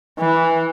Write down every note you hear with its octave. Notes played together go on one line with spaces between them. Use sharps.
E3